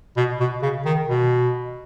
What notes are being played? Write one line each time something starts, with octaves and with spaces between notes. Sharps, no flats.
B2
B2
C#3
D#3
B2